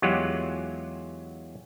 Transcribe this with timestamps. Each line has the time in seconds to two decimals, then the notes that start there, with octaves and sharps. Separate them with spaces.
0.02 E2 F#3 G#3 F4 G4 F#5